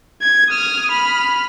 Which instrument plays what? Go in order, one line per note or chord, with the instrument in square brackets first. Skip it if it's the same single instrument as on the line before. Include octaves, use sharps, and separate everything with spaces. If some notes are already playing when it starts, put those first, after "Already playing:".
[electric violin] G#6
D#6 F6
B5 F6